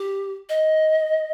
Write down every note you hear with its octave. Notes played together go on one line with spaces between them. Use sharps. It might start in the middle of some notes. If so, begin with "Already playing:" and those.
Already playing: G4
D#5